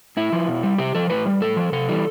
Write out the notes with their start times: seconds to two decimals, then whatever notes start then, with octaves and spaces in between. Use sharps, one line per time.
0.17 A2 E4
0.32 F3
0.48 B2
0.63 G3
0.78 C3 G4
0.95 F3 A4
1.10 A2 B4
1.26 G3
1.41 A2 A4
1.57 F3
1.72 C3 A4
1.89 E3 G3